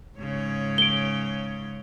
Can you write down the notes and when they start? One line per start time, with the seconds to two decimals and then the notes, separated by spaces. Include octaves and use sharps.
0.18 G#2 C#3 C#5
0.78 D7 G7